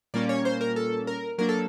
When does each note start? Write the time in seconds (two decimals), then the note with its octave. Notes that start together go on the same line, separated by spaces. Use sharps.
0.14 A#2 G3 A#3 C#4 D5
0.29 C#5
0.45 C5
0.61 A#4
0.76 A4
1.07 A#4
1.38 F#3 A#3 D4 A#4
1.49 A4